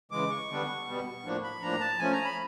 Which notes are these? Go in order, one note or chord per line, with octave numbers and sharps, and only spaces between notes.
C#3 E3 G#3 D6
C#6
D3 G3 B3 D4
B2 G3 B3
A2 F3 A#3 D4
B5
A2 F3 A#3 D4 A#5
A5
F3 A3 C#4 G#5
A#5
B5